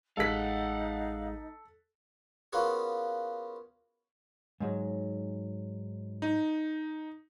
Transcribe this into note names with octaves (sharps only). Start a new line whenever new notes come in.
A1 G#3 D#4 A4 F5 F#5 B6
A#3 B3 C#4 F4 F#4 G#4
G#2 F#3 G#3
D#4